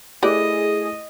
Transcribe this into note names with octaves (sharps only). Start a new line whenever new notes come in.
A3 E4 G4 G#4 B4 D5 D#5